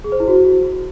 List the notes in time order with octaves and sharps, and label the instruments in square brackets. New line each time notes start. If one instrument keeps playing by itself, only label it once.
[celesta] G#4
C5
E4
F#4